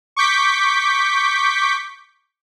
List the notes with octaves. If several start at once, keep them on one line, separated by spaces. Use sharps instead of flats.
C#6 D6 G6 B6